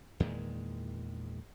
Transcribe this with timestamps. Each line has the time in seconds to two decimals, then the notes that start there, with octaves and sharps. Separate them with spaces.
0.20 E2 A#2 D#3 G#3